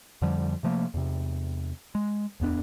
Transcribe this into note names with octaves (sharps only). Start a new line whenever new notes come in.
F2 D3 F3 G3
C3 F3 A3 A#3
E2 C3
G#3
D1 E2 B3 D4